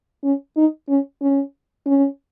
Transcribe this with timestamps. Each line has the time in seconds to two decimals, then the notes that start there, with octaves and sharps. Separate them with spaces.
0.24 C#4
0.57 D#4
0.89 C#4
1.21 C#4
1.86 C#4